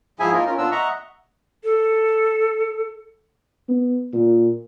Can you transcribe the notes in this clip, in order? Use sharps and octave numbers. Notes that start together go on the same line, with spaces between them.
G#2 F3 E4 G#4 E5 G#5
A#3 D#4 F4 A#4
C#4 F4 A#4
A#2 B3 D4 F4 E6
D#5 E5 F#5 A#5 C#6
A4
B3
A#2